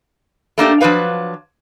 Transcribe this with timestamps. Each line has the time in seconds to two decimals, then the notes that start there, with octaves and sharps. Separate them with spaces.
0.58 A3 A#3 D4 G4
0.81 F3 F#3 D4 B4 F5